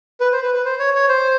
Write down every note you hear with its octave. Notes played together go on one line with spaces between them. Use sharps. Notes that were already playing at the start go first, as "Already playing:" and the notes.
B4
C5
B4
B4
C5
C#5
C#5
C5